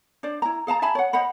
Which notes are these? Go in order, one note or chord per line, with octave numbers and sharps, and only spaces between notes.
D4 C5 D5
E4 A#5
G#4 F5 A5 A#5
E5 G#5 A5 B5
C#5 F#5
C5 D#5 F#5 B5